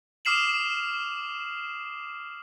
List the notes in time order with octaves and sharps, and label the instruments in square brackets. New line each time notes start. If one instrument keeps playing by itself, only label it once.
[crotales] D6 D#6 F6 C7 E7 F#7